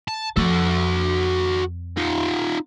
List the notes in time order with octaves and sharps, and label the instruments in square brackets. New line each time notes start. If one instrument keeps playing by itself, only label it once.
[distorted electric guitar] A5
[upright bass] F2 [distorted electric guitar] F#4 A4
[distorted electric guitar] D#4 F4